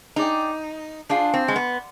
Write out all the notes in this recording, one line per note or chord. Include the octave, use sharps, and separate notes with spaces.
D#4 G#4 D5 G5
D4 F4 G#4 C5
C4
G#3
B3